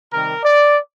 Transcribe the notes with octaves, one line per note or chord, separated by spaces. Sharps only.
C3 D#3 G3 A#4
D5